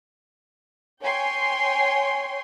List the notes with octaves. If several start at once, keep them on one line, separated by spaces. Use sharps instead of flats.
C#5 G5 G#5 C6